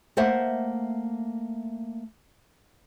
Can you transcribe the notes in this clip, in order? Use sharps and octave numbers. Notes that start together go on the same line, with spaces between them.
A3 A#3 C5 E5 F#5